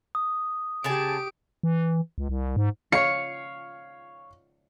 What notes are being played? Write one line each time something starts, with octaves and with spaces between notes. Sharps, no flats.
D#6
C#3 G4 G#4 A5 D7
E3
C#2
C2
G#2
C#5 F5 C#7